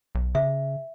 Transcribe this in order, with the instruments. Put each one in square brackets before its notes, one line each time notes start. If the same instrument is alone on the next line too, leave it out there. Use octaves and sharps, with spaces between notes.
[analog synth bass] B1
[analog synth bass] C#3 [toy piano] E5